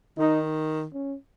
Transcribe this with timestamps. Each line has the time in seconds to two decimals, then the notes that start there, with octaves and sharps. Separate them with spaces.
0.18 D#3 D#4
0.93 C#4